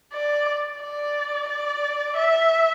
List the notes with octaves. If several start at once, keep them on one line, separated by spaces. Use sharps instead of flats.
D5
D5
D5
E5